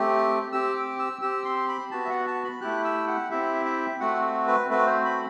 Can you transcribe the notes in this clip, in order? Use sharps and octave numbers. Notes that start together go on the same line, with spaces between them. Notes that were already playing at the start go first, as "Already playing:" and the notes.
Already playing: A3 C4 G4
C4 G4 E6
D6
E6
C4 G4 E6
C6
B5
B3 F#4 A5
E5
F#5
A5
B5
A3 E4 G4 F#6
E6
F#5
C4 E4 G4 E5
E5
A3 C4 F#4 F#5
B4
A3 C4 F#4 B4
C5
B5